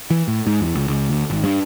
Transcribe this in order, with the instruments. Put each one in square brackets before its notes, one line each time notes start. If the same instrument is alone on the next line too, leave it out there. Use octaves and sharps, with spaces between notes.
[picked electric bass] E3
A2
G#2
E2
C#2
C#2
D2
G#1
G2